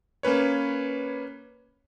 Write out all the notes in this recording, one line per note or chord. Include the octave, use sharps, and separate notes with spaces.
A#3 C#4 B4 C#5